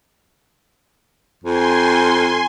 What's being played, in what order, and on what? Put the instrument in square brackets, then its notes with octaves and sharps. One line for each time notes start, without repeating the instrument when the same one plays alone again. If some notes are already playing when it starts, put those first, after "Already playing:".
[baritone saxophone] F2 [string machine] G#5 C6